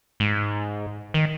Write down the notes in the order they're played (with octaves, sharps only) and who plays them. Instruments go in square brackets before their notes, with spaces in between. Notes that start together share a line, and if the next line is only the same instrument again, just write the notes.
[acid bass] G#2
D#3